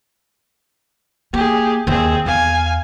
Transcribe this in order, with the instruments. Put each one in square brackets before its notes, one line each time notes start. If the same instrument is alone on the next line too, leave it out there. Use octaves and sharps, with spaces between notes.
[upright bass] A#3 [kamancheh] G4 G#4
[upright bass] D#2 D#3 [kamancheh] C4 G#4
[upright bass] E2 [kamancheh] F5 G#5